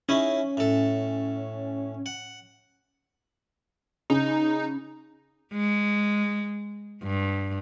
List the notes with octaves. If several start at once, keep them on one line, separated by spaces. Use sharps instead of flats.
C#4 D#4 E4 G#4
A2 A4
F#5
C#3 D#4
G#3
G2